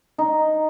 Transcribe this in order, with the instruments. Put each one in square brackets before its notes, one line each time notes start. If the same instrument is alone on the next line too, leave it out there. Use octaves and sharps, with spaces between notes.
[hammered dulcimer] D#4